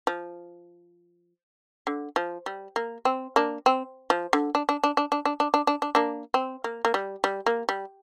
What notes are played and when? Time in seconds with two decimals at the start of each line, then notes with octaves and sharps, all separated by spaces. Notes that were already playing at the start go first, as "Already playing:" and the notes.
0.07 F3
1.87 D3
2.16 F3
2.46 G3
2.76 A#3
3.05 C4
3.36 A#3 D4
3.66 C4
4.10 F3
4.33 D3
4.55 D4
4.69 D4
4.84 D4
4.97 D4
5.12 D4
5.25 D4
5.40 D4
5.54 D4
5.67 D4
5.82 D4
5.95 A#3 D4
6.34 C4
6.64 A#3
6.85 A#3
6.94 G3
7.24 G3
7.46 A#3
7.69 G3